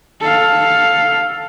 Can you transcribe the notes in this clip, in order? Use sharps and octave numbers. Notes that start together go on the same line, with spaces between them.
A4 F5